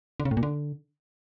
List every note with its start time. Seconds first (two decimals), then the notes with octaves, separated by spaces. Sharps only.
0.20 D3
0.25 C#3
0.31 A2
0.37 A#2
0.43 D3